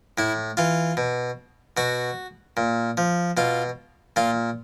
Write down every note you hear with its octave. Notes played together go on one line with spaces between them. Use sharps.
A2 E4
E3 F4
B2
B2 F#4
A#2
F3
B2 F4
A#2 F4